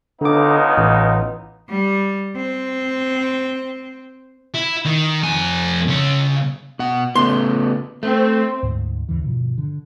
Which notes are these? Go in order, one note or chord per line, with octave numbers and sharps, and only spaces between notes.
C#2 D3 B3 D#4 D6
A1
G3
C4
E4
D#3
F2 G#5
C#3 C6
B2 F#5
C#3 A3 B3 C6
A3 C4
D2 G#2
D#2 C#3 E3
G2 B2 D#3 F3
D3